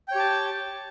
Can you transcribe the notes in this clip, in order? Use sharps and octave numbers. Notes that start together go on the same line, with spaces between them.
G4 C#5 G5 A5